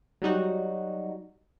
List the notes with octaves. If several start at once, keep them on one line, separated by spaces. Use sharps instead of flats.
F#3 G3 D#4 F#4